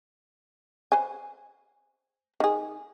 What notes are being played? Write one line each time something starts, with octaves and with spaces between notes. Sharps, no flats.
B4 C5 G#5
D#3 G#4